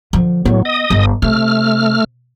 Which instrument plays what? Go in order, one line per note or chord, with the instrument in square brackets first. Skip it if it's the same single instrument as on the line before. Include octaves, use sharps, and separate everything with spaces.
[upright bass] D3 F3
[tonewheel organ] A2 F#3 [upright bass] B3
[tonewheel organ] D#5 D#6
[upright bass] G1
[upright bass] C3 [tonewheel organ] A3 F6